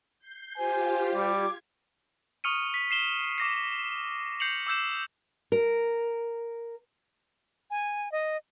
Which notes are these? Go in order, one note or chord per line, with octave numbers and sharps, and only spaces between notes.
G6 C7
F4 G4 C5 G#5
G3 D6 G#6
C#6 D#6 F6 C#7 D#7
B6
C7 E7 G7
D6 A#6 C7
G6 C7 C#7 F7 F#7
D6 E6 G6 E7
A#4
G#5
D#5